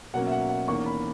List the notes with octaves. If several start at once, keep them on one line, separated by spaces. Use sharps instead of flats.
B2 F#3 A#3 C#4 F#5
E5
F#5
F#5
E2 D#3 A#3 C#4 C#6
B5